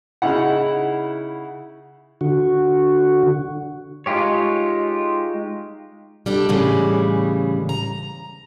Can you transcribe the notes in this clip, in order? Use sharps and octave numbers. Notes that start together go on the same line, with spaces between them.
C#3 D#4 E4 F#5
D3 F#4
G#3 D#4 F4 G4 C#5
G3 D4 A4
A2 C#3 E3 G3 G#3
A#5